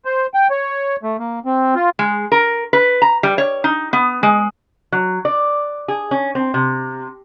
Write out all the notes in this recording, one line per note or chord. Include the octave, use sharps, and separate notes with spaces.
C5
G5
C#5
A3
A#3
C4
F4
G#3
A#4
B4
A#5
G3
C#5
D#4
B3
G#3
F#3
D5
G#4
C#4
C4
C3